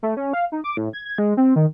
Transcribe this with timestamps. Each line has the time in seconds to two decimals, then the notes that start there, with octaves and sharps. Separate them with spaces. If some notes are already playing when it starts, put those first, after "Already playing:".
0.03 A3
0.17 C#4
0.33 F5
0.52 D#4
0.64 D6
0.77 A2
0.93 G#6
1.05 G#6
1.18 G#3
1.37 C4
1.56 D#3